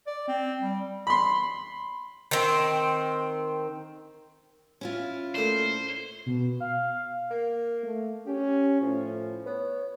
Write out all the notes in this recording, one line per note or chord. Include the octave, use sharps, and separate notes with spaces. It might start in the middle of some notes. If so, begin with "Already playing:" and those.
D5
C4
G3
B5 C6
D#3 C4
C#4 E4 F4
A#2 A3 D4 C5
B2
F5
A#3
A3
C#4 G4
A2 F3
B3 C#5